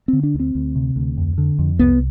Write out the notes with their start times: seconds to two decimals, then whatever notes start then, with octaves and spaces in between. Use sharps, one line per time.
0.08 D3 C4
0.23 D4
0.34 D2
0.40 C4
0.55 D2
0.75 C3
0.96 D2
1.17 F2
1.38 D3
1.59 F2
1.79 C2 B3